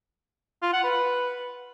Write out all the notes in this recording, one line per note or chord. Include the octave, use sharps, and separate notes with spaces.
F4
F#5
B4